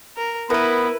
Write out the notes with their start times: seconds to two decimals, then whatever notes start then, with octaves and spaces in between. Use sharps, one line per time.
0.17 A#4
0.50 B3 E4 A#4 B4 B5